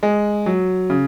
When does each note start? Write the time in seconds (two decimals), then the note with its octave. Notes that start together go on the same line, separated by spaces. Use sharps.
0.03 G#3
0.46 F#3
0.90 C#3